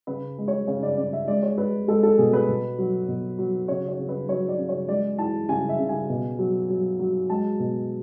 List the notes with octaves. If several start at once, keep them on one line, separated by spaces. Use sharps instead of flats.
C#3 B4
G#3
C#5
C#3 C#5
D5
C#3 D5
E5
G#3 D5
C#5
G#3 B4
G#3 A4
A4
B2 G#4
B4
B2
F#3
B2
F#3
C#3 C#5
C#5
C#3
B4
F#3 C#5
D5
C#3
C#5
G#3 D5
E3 A5
C#3 G#5
E5
C#3
G#5
B2
F#3
F#3
F#3
G#3 A5
B2